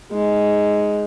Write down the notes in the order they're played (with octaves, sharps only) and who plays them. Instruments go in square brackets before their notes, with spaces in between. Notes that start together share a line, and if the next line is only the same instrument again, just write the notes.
[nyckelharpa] G#3 D#4